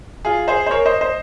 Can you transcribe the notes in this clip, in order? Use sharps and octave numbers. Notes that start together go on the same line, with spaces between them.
F4 G#4
G#4 C5
C5
A#4 C#5
C5 D#5
C5 D#5